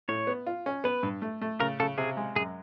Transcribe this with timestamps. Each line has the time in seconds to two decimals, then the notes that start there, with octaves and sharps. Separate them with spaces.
0.09 A2 C#5
0.27 B3
0.47 F4
0.66 C#4
0.84 B3 B4
1.03 G2
1.22 A3
1.42 A3
1.60 C#3 A#4
1.80 C#3 A4
1.98 C3 G#4
2.17 G#3
2.36 F#2 G#4